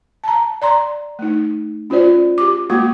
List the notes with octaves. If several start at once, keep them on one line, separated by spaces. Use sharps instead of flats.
A5 A#5
D5 A#5 C6
A3 D#4
C#4 F4 F#4 C5 D5
G4 D6
G#3 A#3 F#4 C#6 D6